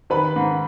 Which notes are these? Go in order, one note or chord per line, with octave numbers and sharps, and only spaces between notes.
D#3 B4 B5
G#2